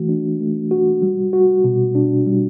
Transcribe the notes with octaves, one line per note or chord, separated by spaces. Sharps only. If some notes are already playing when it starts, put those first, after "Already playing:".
Already playing: E3 A3 F#4
D4
A3
F#4
G3
F#4
B2
D4
G3